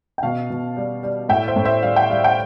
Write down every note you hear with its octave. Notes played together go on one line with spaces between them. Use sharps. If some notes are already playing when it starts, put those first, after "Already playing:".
G5
B2 F5 A5
B2
G3
G3
A2 E5 G5
C5 E5
A2
C5 E5
G3 F5
G5
G3 F5
G5